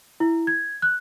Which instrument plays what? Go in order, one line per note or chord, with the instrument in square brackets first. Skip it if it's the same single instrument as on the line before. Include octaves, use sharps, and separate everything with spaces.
[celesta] E4
G#6
F#6